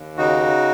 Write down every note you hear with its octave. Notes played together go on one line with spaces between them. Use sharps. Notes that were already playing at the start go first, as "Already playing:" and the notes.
Already playing: D#2
C#3 D#4 F#4